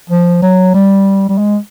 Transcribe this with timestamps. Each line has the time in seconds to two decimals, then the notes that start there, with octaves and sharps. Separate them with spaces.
0.10 F3
0.43 F#3
0.74 G3
1.29 G3
1.38 G#3